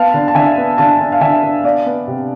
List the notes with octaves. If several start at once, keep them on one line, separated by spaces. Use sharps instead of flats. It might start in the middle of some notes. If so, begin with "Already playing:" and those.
Already playing: B3 F5 A5
D3
A5
D3 E5 G#5
B3
D3 F5 A5
D3
F5
D3 E5 G#5
D3
B3 D5 F5
B3
C3